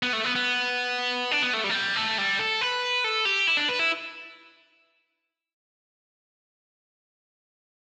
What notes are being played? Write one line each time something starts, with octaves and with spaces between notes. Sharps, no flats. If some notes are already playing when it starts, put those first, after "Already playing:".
B3
A3
B3
B3
D4
B3
A3
G3
A3
G3
A3
G3
A4
B4
A4
G4
E4
D4
B4
E4